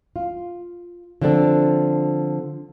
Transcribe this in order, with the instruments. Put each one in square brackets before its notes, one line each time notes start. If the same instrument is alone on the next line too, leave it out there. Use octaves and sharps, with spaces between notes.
[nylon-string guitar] F4
D3 F3 C4 D4 A4